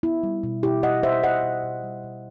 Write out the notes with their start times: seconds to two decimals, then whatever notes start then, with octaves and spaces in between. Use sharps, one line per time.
0.03 B3 E4
0.23 G3
0.43 B2
0.63 B2 E4 G4
0.83 B2 D#5 F#5
1.03 B2 C5 E5
1.23 B2 D#5 F#5
1.43 B2
1.64 B2
1.84 G3
2.04 B2